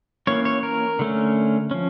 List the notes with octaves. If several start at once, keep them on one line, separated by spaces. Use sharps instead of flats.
E3 A#3 C#4 C#5
C#5
A#4
D3 A3 C#4
F3 C#4